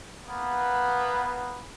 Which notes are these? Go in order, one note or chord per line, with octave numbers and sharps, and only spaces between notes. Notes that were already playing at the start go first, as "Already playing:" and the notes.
A#3 B3